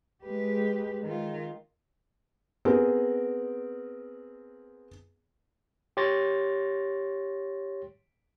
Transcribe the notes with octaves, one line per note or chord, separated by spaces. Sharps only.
G#3 G4 B4
D#3 F4
B3 C4 G#4 A#4
G4 C#5 C6 A6 A#6